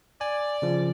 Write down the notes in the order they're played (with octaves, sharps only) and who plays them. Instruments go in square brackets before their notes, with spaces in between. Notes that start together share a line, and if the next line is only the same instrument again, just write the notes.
[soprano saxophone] D5 [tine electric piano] G#5
[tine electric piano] C#3 F3